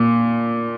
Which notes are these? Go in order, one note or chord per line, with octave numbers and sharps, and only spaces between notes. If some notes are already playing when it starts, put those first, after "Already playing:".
Already playing: A#2